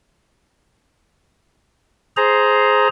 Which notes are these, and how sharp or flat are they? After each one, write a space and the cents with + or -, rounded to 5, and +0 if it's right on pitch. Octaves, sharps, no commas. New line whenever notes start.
G#4 +10 C5 +0 A#5 +0